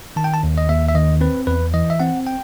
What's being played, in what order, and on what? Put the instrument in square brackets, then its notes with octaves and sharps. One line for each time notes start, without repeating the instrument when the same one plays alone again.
[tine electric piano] D#3 A5
G5
A5
D#2
D#5
D#2 E5
E5
D#3 D#5
C4 B4
E2 B4
E3 D#5
E5
C4 F#5
G5